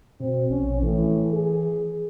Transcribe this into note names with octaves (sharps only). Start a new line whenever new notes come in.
B2 C4
A#1 C#4
A2 E3
G#4